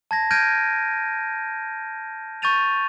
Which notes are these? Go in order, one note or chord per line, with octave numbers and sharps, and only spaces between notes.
A5 G#6 A#6
F6 G6 G#6 A#6 D7 D#7
C#6 G6 A6 D#7 F7